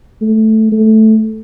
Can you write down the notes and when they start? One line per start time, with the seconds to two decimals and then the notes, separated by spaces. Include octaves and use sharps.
0.21 A3
0.72 A3